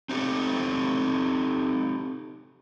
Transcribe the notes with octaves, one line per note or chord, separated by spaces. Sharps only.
C4 D#4 F#4 G4 A4